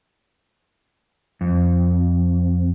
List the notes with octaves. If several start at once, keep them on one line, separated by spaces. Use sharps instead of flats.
F2